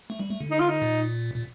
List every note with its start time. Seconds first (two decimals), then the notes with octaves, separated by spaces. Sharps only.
0.10 A3
0.19 G3
0.30 A3
0.41 D3
0.50 D#4
0.59 F4
0.69 D#4
0.82 A#2
1.34 A#2